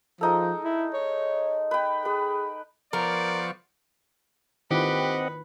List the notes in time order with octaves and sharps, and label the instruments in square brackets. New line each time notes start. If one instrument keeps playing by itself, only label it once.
[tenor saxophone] F3 [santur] G#3 D#4 A4
[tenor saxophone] E4
C#5
[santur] B4 G5
[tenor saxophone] G#4 [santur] B4
[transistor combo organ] F3 C#6 [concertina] B3 C5 F5 [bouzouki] A#4 [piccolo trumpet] D5
[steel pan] D#3 E4 F4 [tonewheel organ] C4 D#5 F#5 [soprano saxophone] G4 [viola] B4